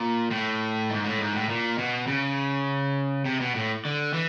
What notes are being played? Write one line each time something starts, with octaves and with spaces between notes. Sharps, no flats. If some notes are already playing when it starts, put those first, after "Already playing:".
Already playing: A#2
A2
G#2
A2
G#2
A2
A#2
B2
C#3
C3
B2
A2
D3
E3